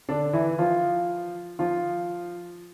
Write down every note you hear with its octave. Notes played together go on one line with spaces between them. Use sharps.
D3 D4
E3 E4
F3 F4
F3 F4